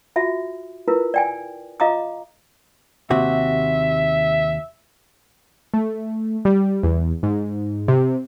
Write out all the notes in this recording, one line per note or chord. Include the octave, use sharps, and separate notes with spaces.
F4 F#4 E5
E4 F4 A#4 B4
D5 G5 G#5
F4 D#5 F5 A#5 D6 D#6
D#2 C3 F#4 E5
A3
G3
E2
G#2
C3